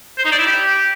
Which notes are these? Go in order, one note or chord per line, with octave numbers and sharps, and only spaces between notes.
C5
D#4
D5
E4
G4